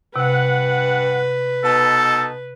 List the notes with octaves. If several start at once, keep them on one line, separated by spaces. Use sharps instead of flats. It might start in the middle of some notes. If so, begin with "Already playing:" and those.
G2 C3 B4 F#5
B2 D#4 A4 A5